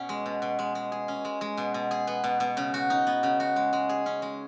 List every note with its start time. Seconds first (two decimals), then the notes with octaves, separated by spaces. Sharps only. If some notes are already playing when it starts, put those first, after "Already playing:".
Already playing: B2 C#4 G#4
0.09 G#3
0.26 B2
0.42 B2
0.59 G#3
0.75 G#3
0.92 G#4
1.08 C#4
1.25 G#3
1.41 G#3
1.58 B2
1.74 B2
1.91 G#4
2.07 B3
2.24 B2
2.40 B2
2.57 C#3
2.74 F#4
2.90 D#4
3.07 B3
3.23 C#3
3.40 F#4
3.56 G#3
3.73 G#3
3.89 G#4
4.06 C#4
4.22 G#3